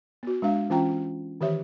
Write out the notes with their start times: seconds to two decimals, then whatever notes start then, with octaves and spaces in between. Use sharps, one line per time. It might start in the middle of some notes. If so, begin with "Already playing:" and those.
0.23 B3 F#4
0.42 G#3 D4 F5
0.70 E3 C#4 F4 G5 A#5
1.41 D#3 E3 G4 C#5 E5